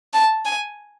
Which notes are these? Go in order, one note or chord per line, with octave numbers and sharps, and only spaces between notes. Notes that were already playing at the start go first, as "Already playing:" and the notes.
A5
G#5